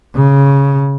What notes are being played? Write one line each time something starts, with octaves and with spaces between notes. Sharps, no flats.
C#3